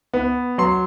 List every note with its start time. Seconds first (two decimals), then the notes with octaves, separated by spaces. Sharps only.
0.13 B3
0.58 F#3 C6